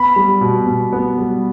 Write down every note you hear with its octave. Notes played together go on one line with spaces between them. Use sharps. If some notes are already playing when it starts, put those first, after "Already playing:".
Already playing: B3 B5
G3
B2
B2
B3
G3